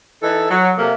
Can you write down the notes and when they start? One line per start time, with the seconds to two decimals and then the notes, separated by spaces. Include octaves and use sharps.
0.23 E3 D#4 A4
0.50 F#3
0.78 C3 A3 A#3